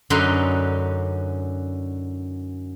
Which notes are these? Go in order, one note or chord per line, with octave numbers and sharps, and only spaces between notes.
F#2 D3 C#4 D#4 B4 C6